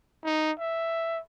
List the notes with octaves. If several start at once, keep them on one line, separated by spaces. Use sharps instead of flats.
D#4
E5